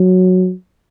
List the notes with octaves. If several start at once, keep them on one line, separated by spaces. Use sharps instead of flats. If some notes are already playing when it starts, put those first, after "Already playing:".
Already playing: F#3